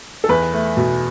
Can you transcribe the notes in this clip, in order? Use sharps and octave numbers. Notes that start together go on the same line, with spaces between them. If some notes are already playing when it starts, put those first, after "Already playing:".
A4
E2 B4
A3
B2